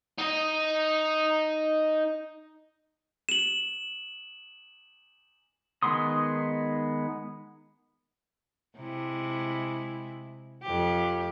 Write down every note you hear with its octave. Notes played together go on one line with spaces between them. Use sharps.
D#4 D#5
E7 F#7
D#3 G#3 B3 C6 D#6
C3 G#3 E4
F2 G4